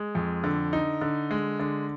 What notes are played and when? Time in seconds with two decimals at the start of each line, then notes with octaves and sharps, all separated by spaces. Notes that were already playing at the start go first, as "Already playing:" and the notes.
Already playing: G#3
0.15 F2
0.44 D3
0.73 D#4
1.01 D3
1.31 G#3
1.59 D3